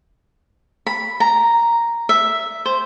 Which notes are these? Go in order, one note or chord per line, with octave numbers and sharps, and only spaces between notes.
B5
A#5
E5
C5